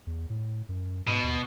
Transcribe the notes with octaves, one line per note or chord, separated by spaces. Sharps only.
E2
A2
F#2
G#2 B2
D#2